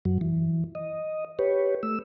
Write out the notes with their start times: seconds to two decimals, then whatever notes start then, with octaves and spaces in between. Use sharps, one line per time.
0.05 F#2 F#3
0.21 E3
0.75 D#5
1.39 G4 B4 C#5
1.83 A3 E6